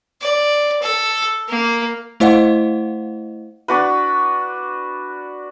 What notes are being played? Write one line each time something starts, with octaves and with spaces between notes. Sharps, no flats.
D5
A4
A#3
A3 E4 C5 D#5 F5 F#5
D4 F#4 B4